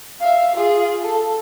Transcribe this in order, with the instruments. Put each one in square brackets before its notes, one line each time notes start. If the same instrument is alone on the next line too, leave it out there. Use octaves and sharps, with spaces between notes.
[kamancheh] E5 F5
F4 G#4
A4